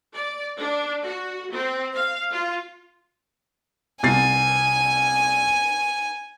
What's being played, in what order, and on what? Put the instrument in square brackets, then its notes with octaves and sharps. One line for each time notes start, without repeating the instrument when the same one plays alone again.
[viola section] D5
D4
F#4
C4
F5
F4
[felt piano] C2 A6 C7 [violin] G#5